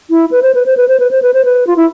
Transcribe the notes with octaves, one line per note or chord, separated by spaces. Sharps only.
E4
B4
C5
B4
C5
B4
C5
B4
C5
B4
C5
B4
F4
E4